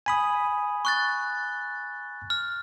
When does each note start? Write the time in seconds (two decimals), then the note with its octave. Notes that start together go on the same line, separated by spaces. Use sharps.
0.06 G#5 B5 D#6
0.85 C#6 F#6 A6
2.30 F6